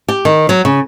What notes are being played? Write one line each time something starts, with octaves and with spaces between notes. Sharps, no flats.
G4
D#3
F#3
C#3